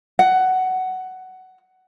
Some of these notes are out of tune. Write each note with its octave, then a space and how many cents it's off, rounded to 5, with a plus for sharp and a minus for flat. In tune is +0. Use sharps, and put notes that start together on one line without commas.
F#5 +10